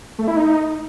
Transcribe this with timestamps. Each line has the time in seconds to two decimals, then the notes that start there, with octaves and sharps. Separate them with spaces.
0.19 A3
0.28 E4
0.37 D#4